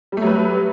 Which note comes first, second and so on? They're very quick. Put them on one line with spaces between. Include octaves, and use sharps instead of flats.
G3 A3 F#3 B4